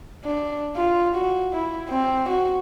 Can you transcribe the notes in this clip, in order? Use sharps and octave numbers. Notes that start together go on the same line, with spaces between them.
D4
F4
F#4
E4
C4
F#4